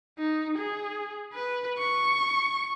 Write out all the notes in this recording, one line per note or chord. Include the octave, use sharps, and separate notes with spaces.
D#4
G#4
B4
C#6